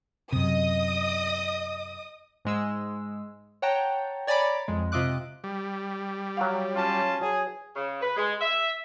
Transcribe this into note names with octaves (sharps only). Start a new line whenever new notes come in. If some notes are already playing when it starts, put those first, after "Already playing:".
F#2 C3 D#5 D#6
G#2 G#3 E6
C#5 F#5 G5 A5 A#5
C#5 D5 G#5 A#5 B5 D6
F2 G#3
C3 F4 D#5 E5 D6 F#6
G3
F#3 F#4 F5
C#4 F4 A5
F#3 G#4
C#3
B4
G#3
E5